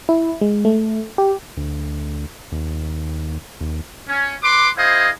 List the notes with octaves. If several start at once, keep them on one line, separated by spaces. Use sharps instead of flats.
E4
G#3
A3
G4
D2
D#2
D#2
C#4
B4 C6 D6
E4 G#4 C5 D#5 F5